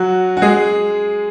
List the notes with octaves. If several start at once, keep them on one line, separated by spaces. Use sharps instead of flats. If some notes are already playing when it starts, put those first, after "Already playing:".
Already playing: F#3 F#4
F#4
G#3 G#4